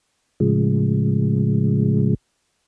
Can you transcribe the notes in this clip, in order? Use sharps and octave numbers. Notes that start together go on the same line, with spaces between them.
A2 C#3 F3 G#3